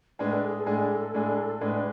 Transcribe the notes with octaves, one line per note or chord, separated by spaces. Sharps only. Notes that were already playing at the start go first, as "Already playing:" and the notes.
A2 G#3 D4 G#4 B4
A4
G#4
A4
A2 G#3 D4 G#4
A2 G#3 D4 G#4
A2 G#3 D4 G#4 B4